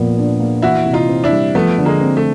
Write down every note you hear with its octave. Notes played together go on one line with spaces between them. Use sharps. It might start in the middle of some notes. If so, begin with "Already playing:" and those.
Already playing: A#2 F3 B3
D4
A#3
E3 E4 F#4
C3
D#4 F4
C4
D4 E4
G3
F3 A3 B3
D3
G#3 A#3
C4
A3